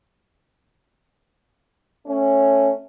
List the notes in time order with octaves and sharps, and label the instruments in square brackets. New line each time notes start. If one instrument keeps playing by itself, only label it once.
[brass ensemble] A3 C#4